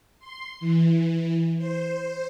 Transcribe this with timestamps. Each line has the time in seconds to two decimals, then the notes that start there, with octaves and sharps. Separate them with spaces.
0.19 C6
0.60 E3
1.58 C5